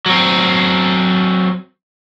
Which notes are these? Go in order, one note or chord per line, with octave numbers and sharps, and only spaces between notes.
F#3 C4